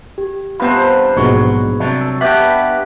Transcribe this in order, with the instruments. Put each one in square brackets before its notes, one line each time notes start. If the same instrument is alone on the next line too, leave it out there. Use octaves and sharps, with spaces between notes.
[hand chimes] G4
[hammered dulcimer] G2 C3 C5 [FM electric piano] B3 F4 [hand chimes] B5 F#6
[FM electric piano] A#1 G#2 B2 [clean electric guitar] F#3 [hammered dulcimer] C#5
[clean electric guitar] C3 F#3 D4
[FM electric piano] A4
[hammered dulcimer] G2 [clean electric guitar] B3 G4 [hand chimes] E5 D6 F#6 [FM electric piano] B5